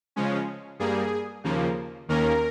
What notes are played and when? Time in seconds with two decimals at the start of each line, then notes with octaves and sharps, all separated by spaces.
0.16 C#3 F3 G#3 C#4
0.79 G2 G3 A#3 G#4
1.44 D#2 C#3 F3 A#3
2.09 D#2 D#3 A#3 C#4 A#4